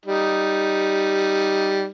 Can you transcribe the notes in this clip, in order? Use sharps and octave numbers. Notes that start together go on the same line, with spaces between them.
G3 D#4